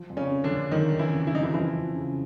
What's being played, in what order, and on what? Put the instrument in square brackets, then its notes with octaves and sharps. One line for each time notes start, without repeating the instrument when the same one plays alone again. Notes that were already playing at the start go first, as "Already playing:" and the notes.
Already playing: [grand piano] F3
F2
[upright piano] C#3 C#4
[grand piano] C#3
[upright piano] D3 D4
[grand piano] F2
[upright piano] D#3 D#4 [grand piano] F3
[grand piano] F2
[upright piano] E3 E4
[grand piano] C#3
[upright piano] E4
[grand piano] F2 [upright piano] D#4
[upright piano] E3 E4
[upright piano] E3 E4 [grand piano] F3
[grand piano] F2
C#3